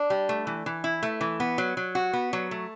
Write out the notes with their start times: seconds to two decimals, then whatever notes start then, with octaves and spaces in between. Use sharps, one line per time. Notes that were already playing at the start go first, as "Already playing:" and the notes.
Already playing: D4
0.10 G3
0.29 A3
0.47 E3
0.66 E3
0.84 E4
1.03 A3
1.21 E3
1.40 B3
1.58 F#3
1.77 F#3
1.95 F#4
2.13 B3
2.33 F#3
2.51 A3